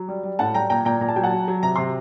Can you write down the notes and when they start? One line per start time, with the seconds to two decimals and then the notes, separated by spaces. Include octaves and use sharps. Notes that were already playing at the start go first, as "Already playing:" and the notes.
Already playing: F#3
0.08 G3
0.23 G3
0.39 A2 F#5 A5
0.54 G3 G5 A#5
0.70 A#2 G5 A#5
0.85 A#2 G5 A#5
1.01 A#2 A#5
1.08 A5
1.16 F#3 G5
1.24 F#5 A5
1.32 F#3
1.48 F#3
1.63 C3 A#5
1.76 C3 C6